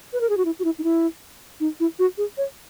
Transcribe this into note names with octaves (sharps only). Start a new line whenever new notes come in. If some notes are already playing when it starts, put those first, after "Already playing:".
B4
A#4
G#4
F#4
E4
F#4
E4
D#4
E4
D#4
E4
F#4
G#4
C#5